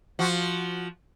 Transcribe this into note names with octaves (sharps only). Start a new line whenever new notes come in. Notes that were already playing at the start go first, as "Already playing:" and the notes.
F3 F#4